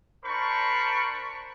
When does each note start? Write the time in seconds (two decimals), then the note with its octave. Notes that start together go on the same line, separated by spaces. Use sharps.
0.24 D4 A#4 C5 B5 C#6